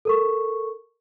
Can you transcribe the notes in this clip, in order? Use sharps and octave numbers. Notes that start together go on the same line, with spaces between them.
A4 A#4 C#6